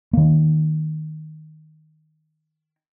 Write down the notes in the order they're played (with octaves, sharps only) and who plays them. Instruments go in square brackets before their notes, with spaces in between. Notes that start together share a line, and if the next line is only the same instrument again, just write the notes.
[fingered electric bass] D#3 A#3